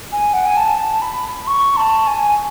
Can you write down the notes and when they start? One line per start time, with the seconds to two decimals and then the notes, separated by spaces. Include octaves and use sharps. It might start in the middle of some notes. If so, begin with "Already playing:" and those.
0.12 G#5
0.33 F#5
0.45 G#5
0.57 A5
1.02 B5
1.47 C#6
1.76 A5
2.07 G#5